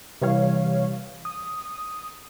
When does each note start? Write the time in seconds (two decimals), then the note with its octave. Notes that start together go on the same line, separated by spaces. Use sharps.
0.22 C3 E3 G3 C#5 F5
1.25 D#6